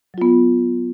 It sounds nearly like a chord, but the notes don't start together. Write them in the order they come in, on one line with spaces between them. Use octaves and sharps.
F#3 F4 B3